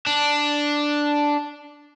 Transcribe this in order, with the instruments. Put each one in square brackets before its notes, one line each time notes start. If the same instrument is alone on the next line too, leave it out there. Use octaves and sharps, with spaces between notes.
[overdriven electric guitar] D4